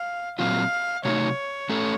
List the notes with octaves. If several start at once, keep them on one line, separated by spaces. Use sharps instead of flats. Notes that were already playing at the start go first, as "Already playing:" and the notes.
Already playing: F5
A#2 F#3 C4 F4 F5
C3 F#3 A3 D#4 C#5
A3 C#4 A4